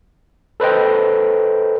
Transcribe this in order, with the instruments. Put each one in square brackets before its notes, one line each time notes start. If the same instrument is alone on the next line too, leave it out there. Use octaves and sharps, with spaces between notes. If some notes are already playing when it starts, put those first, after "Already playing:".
[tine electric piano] A4 B4 C5 D#5 G5